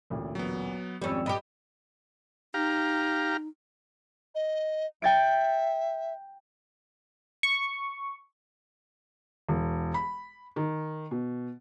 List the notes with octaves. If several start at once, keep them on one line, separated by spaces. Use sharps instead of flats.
A1 D2 A#2
F#3 B3
G#1 F2 G3 C#4 E6
G2 G4 D#5 B5
D#4 G4 F5 A#5
D#5
E5 G5 A6 D7
C#6
E1
B5
D#3
B2